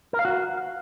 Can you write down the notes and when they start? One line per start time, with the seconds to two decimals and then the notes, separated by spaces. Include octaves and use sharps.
0.13 A#4
0.19 F5
0.25 F#4